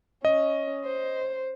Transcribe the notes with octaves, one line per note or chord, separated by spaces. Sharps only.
C#4 D#5
C5